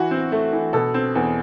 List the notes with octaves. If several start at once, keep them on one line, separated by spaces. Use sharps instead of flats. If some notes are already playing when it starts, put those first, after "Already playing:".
Already playing: E3 F#4
C4
A3
E3
B2 A4
C4
E2